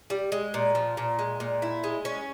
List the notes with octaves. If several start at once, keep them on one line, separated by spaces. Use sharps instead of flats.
G3
G#3
A#2
F3
A#2
G#3
A#2
E4
G#3
C#4